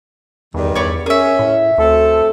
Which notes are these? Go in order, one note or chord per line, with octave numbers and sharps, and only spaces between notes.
E2 G2 D#3
E2 C#5 D5 B5
C#4 G#4 A#4 E5
A2
D2 A3 C4 A4